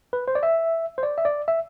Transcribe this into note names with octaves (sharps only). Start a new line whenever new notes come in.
B4
C5
D5
E5
C5
D5
E5
D5
E5